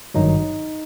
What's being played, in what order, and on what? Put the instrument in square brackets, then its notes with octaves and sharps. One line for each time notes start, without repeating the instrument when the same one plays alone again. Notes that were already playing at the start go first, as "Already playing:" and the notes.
[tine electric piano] G#1 G2 D#3 F#3 D#4